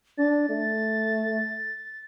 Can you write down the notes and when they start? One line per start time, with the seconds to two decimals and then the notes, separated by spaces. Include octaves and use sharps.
0.18 D4 A6
0.50 A3